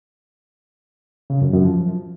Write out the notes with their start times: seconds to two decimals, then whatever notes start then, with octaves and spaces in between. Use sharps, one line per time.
1.30 C#3
1.41 F#2
1.53 F#2
1.65 F3